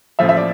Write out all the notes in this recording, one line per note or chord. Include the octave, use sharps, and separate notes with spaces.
A1 A2 F3 E5
E5
D5